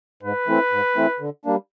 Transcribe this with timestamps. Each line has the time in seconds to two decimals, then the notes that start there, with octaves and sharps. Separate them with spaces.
0.23 G#2 B4
0.47 E3 A3 C4 E4
0.71 G#2
0.96 E3 A3 C4 E4
1.20 D3
1.45 G3 A#3 D4